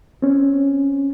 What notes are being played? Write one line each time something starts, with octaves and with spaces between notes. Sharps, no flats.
C4 C#4